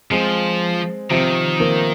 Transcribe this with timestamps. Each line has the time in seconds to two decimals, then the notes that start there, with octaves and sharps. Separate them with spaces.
0.11 F3 G#3 C4
1.10 C3 D#3 F3
1.60 F3 A#3